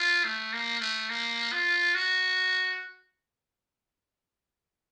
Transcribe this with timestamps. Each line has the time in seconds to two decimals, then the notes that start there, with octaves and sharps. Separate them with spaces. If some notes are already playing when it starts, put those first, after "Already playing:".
Already playing: F4
0.24 A3
0.53 A#3
0.80 A3
1.09 A#3
1.52 F4
1.94 F#4